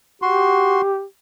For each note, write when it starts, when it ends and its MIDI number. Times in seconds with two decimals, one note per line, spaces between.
0.22 0.82 66
0.22 1.03 67
0.22 0.82 84